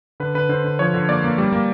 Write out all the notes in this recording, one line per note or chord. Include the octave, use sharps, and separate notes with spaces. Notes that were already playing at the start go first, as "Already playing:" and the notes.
D3 B4
D3 B4
D3 C5
D3
F3 C#5
D3
A#3 D5
A#3
G3
A#3